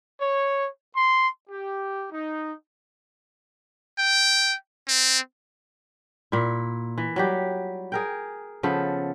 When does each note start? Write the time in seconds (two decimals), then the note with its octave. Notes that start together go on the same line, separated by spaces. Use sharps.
0.21 C#5
0.94 C6
1.49 G4
2.12 D#4
3.99 G5
4.88 C4
6.32 A#2 E4
6.98 E3
7.16 F#3 G3 G4
7.92 G#4 A#4 G5
8.63 C#3 F3 B3 A4